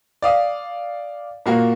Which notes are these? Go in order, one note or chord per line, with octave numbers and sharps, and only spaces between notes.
D5 F5 D#6
A#2 A#3 F#4